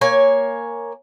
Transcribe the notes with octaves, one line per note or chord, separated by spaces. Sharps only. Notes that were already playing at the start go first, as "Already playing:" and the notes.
A#3 C#5 G#5